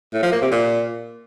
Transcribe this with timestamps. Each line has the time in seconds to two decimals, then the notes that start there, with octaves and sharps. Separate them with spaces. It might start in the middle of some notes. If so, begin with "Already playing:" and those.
0.13 A2
0.23 F3
0.32 A#3
0.42 C3
0.52 A#2